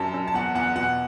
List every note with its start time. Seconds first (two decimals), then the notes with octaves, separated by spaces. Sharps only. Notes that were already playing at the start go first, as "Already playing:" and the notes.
Already playing: F#2 A5
0.14 F#2
0.28 A5
0.34 E2 F#5
0.55 E2 F#5
0.76 B2 F#5